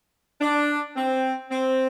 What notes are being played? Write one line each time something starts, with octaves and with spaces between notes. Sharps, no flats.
D4
C4
C4